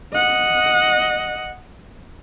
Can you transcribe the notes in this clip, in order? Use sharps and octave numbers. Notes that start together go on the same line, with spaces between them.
D#5 F#5